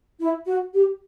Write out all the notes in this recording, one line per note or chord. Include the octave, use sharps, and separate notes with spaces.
E4
F#4
G4